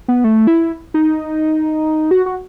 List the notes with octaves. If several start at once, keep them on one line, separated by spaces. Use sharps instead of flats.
B3
A3
E4
D#4
F#4
F#4